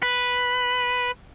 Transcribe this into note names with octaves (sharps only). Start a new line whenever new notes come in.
B4